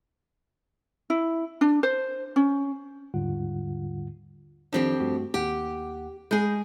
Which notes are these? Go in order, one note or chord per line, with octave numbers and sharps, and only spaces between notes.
E4
D4
C5
C#4
D#2 G#2 D3 G3 F4 F#5
F2 D#3 F3 C4 D4 G4
G2 A3 F#4
D#2 G4 F#5
G#3 G#4 B5 G6